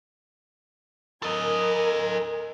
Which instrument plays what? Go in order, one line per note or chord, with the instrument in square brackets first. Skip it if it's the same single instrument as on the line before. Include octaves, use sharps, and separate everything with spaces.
[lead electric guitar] A4 D#5 [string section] A#4 G#5